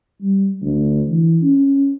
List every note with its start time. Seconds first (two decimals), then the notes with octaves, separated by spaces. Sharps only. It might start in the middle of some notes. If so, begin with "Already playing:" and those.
0.21 G3
0.61 D2
1.08 E3
1.42 C#4